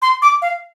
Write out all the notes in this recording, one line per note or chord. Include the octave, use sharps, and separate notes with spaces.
C6
D6
F5